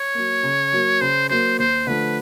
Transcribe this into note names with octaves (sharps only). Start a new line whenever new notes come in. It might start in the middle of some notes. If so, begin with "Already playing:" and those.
Already playing: C#5
F#3 A#3
C#3
F#3 A#3
C#3 C5
F#3 A#3 C5
D#2 C5
D3 F3 A3 B4